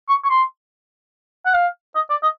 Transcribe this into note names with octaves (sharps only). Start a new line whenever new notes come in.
C#6
C#6
C6
F#5
F5
D#5
D5
D#5